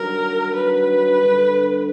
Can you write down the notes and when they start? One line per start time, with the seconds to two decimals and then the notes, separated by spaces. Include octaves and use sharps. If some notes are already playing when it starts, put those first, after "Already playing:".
Already playing: G2 D#3 F#3 A#4
0.54 B4
1.22 G2 D3 G3